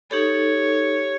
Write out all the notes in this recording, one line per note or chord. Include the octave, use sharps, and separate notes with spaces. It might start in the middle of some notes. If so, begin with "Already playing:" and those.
D#4 G4 A4 C#5